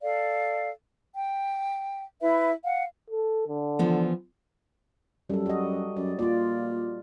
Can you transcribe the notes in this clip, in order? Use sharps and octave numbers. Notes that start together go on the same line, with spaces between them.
A4 D5 F5
G5
E4 B4 E5
F5 F#5
A4
D3
E3 F3 B3
F#2 G3 A4
F#4 D#5
F#2 D5
A#2 F4 D5